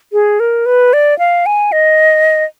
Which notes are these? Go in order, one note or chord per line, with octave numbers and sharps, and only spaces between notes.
G#4
A#4
B4
D5
F5
G#5
D#5